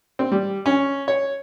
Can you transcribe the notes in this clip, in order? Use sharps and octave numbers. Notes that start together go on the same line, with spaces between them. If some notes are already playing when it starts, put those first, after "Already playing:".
C4
G3
C#4
C#5